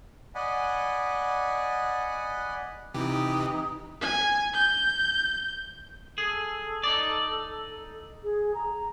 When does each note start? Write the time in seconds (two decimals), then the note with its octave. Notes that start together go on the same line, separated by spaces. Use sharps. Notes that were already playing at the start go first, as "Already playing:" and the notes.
0.35 D5 D#5 F#5 G#5 B5
2.94 C3 E3 D#4 G4
4.01 G#5
4.53 G6
6.18 G#4 A4
6.83 D#4 D5
8.23 G#4
8.54 A#5